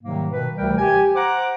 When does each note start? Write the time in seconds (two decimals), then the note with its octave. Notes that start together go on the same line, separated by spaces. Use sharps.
0.03 G#2 C3 D#3 F#3 G3 A#3
0.31 B2 D#3 B4
0.57 D2 C3 E3 G3 A#4 G5
0.78 G4 G#5
1.15 C5 F#5 A#5 D6